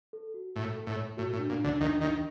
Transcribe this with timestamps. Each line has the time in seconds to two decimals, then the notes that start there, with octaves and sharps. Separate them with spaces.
0.13 A4
0.34 F#4
0.56 A2 A4
0.77 A4
0.87 A2
0.96 C#5
1.17 A2 F#4
1.33 A2
1.39 D4
1.50 A#2
1.59 D4
1.64 D2 D3
1.80 D#2 D#3 D4
2.01 D#2 D#3 D4